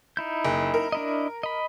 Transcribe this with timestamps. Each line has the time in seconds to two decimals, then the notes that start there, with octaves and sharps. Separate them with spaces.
0.17 D#4 E4 G6
0.45 F#1
0.74 A#4
0.92 D4 E4 D#5
1.43 D#5 B5